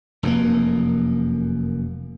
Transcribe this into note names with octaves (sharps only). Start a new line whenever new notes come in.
F1 F#2 A#2 A#3